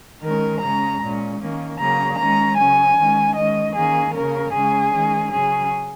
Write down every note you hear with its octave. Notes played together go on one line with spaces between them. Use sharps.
D#3 G#3 C#4 A#4
C#3 G#3 C#4 A#5
A#2 G#3 C#4
D#3 A#3 C#4
C#3 F#3 A#3 C#4 A#5
D#3 G#3 C#4 A#5
C#3 F#3 C#4 G#5
D#3 G#3 C#4
D#3 G#3 C#4 D#5
D#3 A#3 C#4 G#4
C#3 A#3 C#4 A#4
C#3 G#3 C#4 G#4
D#3 G#3 C#4
C#3 F#3 C#4 G#4